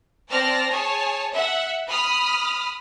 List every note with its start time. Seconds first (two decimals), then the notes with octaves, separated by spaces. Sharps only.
0.31 C4 D5 A5 F6 A#6
0.71 G#4 C#5 G#5 A5
1.33 E5 F#5
1.88 B5 D#6 F6